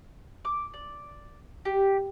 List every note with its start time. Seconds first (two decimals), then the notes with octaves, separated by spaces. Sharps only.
0.45 D6
0.74 D5
1.65 G4